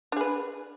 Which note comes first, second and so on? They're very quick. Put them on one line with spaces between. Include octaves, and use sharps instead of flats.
D4 G#4 B4